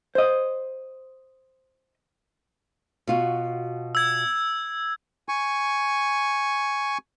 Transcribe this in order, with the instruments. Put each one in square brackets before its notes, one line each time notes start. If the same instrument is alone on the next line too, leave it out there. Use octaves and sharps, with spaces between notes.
[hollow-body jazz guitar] C5 D#5
[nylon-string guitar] B2 F4 F#4
[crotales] E6 G#6
[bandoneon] G#5 C#6